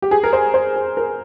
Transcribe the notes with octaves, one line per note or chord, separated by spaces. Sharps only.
G4
G#4
A#4
C5
C5
G#4
A#4